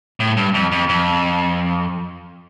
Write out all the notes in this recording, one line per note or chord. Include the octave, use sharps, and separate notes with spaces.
A2
G2
F2
F2
F2